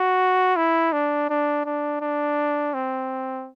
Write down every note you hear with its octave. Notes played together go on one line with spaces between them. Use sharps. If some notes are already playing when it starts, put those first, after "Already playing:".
Already playing: F#4
E4
D4
D4
D4
D4
C4